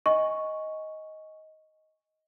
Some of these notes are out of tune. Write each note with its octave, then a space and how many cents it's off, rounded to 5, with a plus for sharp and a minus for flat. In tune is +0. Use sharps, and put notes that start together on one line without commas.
D#5 +10 G#5 -10 C#6 +0